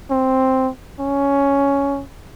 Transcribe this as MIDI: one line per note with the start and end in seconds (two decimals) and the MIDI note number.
0.10 0.70 60
1.00 2.03 61